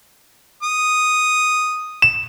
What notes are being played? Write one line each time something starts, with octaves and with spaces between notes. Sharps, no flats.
D#6
E7